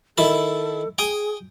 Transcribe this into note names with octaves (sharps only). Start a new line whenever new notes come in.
D#3 E4 A4 A5
G#4 G5 G#5 D#6